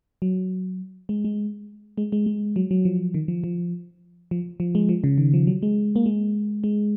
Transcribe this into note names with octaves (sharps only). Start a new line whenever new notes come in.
F#3
G#3
G#3
G#3
G#3
G#3
F#3
F#3
F3
D#3
F3
F3
F3
F3
G#3
F3
C#3
D#3
F3
F#3
G#3
A#3
G#3
G#3